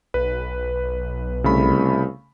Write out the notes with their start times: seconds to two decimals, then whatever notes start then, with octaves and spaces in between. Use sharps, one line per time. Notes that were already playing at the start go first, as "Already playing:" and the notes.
0.14 B1 B4
1.44 C2 C#3 A3 B5